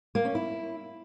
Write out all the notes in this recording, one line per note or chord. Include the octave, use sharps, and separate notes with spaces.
A#3
C#4
E4